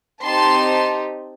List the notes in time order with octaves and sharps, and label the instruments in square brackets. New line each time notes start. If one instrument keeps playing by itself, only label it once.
[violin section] C4 D#4 G4 A5 C6